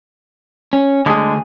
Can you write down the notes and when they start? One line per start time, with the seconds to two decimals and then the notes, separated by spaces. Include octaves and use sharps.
0.73 C#4
1.06 D2 D3 G#3 G#4